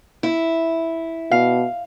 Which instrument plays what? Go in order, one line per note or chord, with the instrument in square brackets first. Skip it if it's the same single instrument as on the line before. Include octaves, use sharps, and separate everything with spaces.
[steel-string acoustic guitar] E4
[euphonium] B2 [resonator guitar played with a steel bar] F5